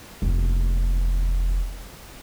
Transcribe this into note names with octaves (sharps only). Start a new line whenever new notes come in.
F1 D#2